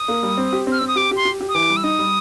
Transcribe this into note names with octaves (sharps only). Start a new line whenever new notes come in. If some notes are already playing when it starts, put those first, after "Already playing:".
Already playing: D#6
A#3
G3
C4
G4
C4 F6
C4 E6
D#6
G4 D6
G4 C6
G4
G4
D#6
E3 D6
G3
E6
D#4 D#6
G3